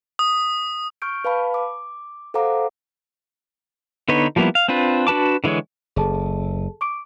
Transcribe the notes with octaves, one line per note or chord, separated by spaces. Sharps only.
D#6
C#6 F6 G6 D7
B4 F5 A5 B5
D6
A4 C5 F5 F#5 A#5 D6
D3 B3 D#4 B4 C#5
F3 G3 A#3 B3 E4
F5
C4 D4 F4 B4
D4 F#4 B4 A5 D6
D3 E3 G#3 G#4 C#5
F#1 G#4 A4 A5
C#6 D6 D7